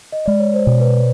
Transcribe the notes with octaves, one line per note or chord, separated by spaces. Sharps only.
D#5
G#3 D5
C#5
C5
B2
B4